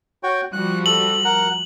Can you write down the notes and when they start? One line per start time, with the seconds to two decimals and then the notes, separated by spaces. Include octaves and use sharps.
0.23 F#4 C#5 G5
0.53 F3 G3 F#4 F#6
0.86 A4 F#7
1.24 A#4 F#5